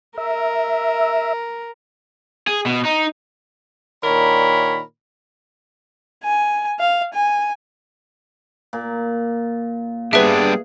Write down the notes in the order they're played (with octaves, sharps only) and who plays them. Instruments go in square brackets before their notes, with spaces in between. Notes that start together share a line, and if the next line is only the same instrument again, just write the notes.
[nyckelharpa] A#4 [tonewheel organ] E5
[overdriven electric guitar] G#4
B2
D#4
[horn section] A#2 D#3 D4 A#4 C#5 B5
[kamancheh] G#5
F5
G#5
[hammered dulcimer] A#2
[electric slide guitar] G3 B3 D4 [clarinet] G#4 [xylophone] B4 E5